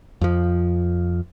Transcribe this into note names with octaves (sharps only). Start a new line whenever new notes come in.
F2 F3